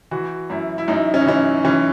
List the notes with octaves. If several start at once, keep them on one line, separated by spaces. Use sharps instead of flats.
E3 F#4
F#2 E4
E4
F#2 D#4
C#4
D#4
E3 C#4
E3 C#4